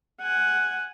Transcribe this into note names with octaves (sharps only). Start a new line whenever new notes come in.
F#5 G#5